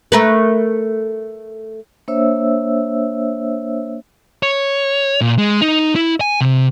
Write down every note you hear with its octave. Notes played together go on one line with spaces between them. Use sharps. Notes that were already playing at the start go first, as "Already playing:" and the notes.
A3 A#4 B4
A#3 D4 C5 C#5 E5 E6
C#5
A#2
G#3
D#4
E4
G#5
C3